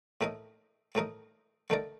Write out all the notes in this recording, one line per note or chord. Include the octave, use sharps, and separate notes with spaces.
A2 A3 D#4 A#4 D#5
A2 A3 D#4 A#4 D#5
D3 A3 D#4 A#4 D5